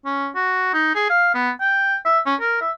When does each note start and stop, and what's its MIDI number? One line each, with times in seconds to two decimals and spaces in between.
0.05 0.28 61
0.36 0.72 66
0.74 0.92 63
0.95 1.10 68
1.10 1.31 77
1.34 1.50 59
1.61 1.97 79
2.05 2.19 76
2.26 2.35 61
2.40 2.57 70
2.61 2.71 76